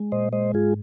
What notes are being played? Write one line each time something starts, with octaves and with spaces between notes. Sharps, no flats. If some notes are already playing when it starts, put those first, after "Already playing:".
Already playing: G#3
A#2 C5 D#5
G#3 C5 D#5
G#2 F4 G#4